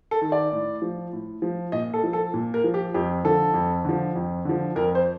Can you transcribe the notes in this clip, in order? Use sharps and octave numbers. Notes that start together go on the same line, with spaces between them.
A4
D#3
D5
A2
F3
A2
F3
A#2 D#5
A4
F3
A4
A#2
A#4
F3
G4
F2 G4
D3 F3 A4
F2
D3 F3
F2
D3 F3
F2 A#4
C5